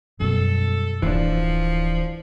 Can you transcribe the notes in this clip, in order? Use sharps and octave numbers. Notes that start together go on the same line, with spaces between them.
F#2 B2 G3 A4
D1 E3 F3 D4